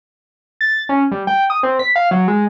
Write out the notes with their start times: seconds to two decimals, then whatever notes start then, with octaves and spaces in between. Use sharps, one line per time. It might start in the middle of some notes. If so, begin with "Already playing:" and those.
0.61 A6
0.89 C#4
1.11 G3
1.27 G5
1.50 D#6
1.63 C4
1.79 B6
1.96 F5
2.11 F#3
2.28 G#3